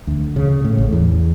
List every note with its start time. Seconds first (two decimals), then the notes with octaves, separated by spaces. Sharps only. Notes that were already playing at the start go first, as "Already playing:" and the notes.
0.07 D2
0.36 C#3
0.65 A2
0.78 A1
0.92 E2